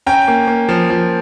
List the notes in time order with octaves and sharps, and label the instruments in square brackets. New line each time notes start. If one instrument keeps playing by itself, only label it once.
[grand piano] C#4 G5 A#5
A#3
A#3
F3
F3